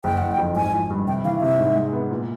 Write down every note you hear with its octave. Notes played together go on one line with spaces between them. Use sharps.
F#1 G5
F#1 F#5
G5
F2
G#1 G#5
F3
G2
C3 G5
E3 F5
C3 E5
G#2
G#3
B3
A#2